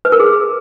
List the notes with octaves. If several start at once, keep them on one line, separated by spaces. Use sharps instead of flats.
B4
A#4
G#4